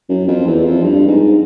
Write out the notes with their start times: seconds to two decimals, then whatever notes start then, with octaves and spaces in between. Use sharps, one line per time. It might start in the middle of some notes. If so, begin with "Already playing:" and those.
0.09 F#2
0.28 F2
0.47 E2
0.65 F2
0.83 G2
1.07 G#2